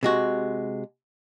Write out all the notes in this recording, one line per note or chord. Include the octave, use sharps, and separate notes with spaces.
C3 G#3 F#4